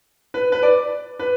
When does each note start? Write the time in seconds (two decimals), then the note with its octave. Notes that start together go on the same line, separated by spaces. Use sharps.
0.34 B4
0.52 B4
0.63 D5
1.19 B4